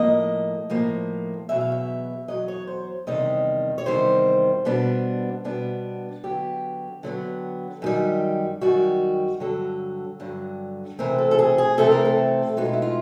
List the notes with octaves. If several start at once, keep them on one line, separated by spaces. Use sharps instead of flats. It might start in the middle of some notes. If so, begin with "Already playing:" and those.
Already playing: A2 F3 A#3 D#5
A2 F3 A#3
E2 B2 F#3 E5
F5
E5
E2 B2 F#3 D#5
C#5
C5
E2 C3 D#3 G3 D#5
C#5
E2 C3 D#3 G3 C5
B2 G3 B3 D4
B2 G3 B3 D4
D3 F#3 B3 G4
D3 F#3 B3
F#2 D#3 G3
F#2 D#3 G3 F#4
G2 D3 F#3 A4
G2 D3 F#3
C3 E3 A3 C4 A#4
A4
A4
G#4
G#4
C3 E3 A3 C4 A4
A#4
A4
B2 G#3 B3 D#4 F#4
F4
E4
F4